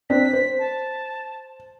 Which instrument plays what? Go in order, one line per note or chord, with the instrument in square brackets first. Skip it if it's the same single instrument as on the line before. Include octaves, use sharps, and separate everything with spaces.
[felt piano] C4 D4 [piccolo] B6
[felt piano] C5
[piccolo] A5